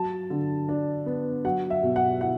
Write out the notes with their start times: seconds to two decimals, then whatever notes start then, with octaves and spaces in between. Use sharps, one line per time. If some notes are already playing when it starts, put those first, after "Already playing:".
Already playing: F#3 A5
0.30 D3
0.69 D4
1.06 B3
1.45 F#3 F#5
1.70 E5
1.83 B2
1.96 F#5
2.21 E4 F#5